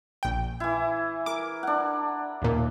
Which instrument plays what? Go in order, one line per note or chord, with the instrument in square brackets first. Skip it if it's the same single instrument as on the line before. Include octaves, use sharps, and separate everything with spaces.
[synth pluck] A#1 G5
[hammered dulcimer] E3 E4
[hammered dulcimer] A#4 [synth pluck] D6
[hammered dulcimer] D4 F#5
[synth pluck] D#2 A#2